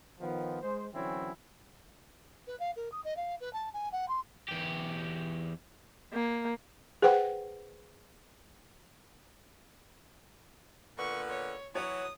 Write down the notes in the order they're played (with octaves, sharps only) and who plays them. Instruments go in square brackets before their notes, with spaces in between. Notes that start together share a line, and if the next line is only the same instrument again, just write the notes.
[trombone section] D#3 F3 B3
G#3 C5
D3 E3 F#3 C4 C#4 E4
[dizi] B4
F5
A#4
D#6
D#5
F5
B4
A5
G#5
F#5
C6
[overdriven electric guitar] E2 G4
[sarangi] A#3
[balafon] G#4 B4 C5 F#5 G5
[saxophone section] A#2 D3 B3 [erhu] C#6
[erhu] C#5
[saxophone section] E3 F#3 [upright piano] C#5 [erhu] D#6